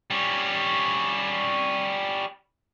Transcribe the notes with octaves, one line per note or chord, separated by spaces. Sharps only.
G3 C#4